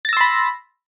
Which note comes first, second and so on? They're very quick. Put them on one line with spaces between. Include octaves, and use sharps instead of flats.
A6 A#6 E6 C6 B5